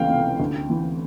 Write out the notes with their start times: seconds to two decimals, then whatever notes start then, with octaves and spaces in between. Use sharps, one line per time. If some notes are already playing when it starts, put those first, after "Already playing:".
Already playing: C#2 E3 A3 F5 G5
0.10 C3
0.40 D2
0.70 E3